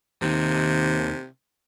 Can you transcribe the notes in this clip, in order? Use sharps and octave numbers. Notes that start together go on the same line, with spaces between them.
D#2 C3 D#3